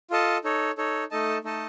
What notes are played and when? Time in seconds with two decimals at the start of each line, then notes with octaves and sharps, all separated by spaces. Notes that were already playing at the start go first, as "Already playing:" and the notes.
0.11 F4 A4 D#5 A5
0.44 D#4 A4 C#5
0.78 D#4 A4 C#5
1.11 A3 D#4 A4 D#5 A5
1.44 A3 D#4 A4 D#5 A5